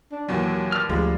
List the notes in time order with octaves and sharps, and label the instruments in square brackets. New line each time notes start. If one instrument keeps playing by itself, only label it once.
[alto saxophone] D4
[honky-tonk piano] D#2 A#2 E3 [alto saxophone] F#3
[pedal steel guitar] G3 D5 F6
[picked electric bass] D2 F3 [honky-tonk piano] G#3